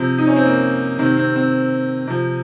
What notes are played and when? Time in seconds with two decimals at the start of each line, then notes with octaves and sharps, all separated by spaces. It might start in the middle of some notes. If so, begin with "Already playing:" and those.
Already playing: C3 F3 C4
0.18 D#4
0.27 C#4
0.36 C4
0.45 A#3
0.99 C3 D#3 C4
1.17 C4
1.36 C4
2.07 C3 F3